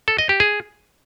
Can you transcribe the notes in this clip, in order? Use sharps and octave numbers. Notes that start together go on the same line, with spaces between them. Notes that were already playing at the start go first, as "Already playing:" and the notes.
A4
D#5
G4
G#4